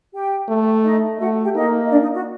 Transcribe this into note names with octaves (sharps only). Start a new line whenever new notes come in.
G4 G5
A3
D#4 D#5
A3 F#4 F#5
G4 G5
A#3 D#4 D#5
D#5
D4 D5
D#4
F#4